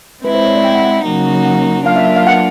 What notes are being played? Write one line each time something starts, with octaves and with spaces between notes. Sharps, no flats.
G#3 C4 E4 B4
C5
C#5
D5
G5
F#5
F#5
C#3 F#3 A#3 D#4 F#4
F#5
F#3 A#3 D4 F4 F5
E5
E5
F5
F#5